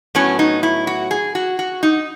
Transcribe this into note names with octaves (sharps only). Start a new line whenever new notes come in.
A2 F#3 B3 C#4
D#4
E4
F#4
G#4
F#4
F#4
D#4